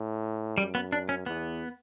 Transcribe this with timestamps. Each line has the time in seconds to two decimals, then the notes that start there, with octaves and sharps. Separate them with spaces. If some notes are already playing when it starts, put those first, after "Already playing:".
Already playing: A2
0.58 F#2 G3
0.75 B3
0.92 D4
1.09 C#4
1.26 E2 B3